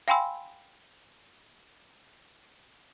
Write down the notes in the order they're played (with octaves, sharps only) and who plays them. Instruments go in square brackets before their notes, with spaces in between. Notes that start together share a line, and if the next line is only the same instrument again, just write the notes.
[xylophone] F5 G5 G#5 B5 C6 E6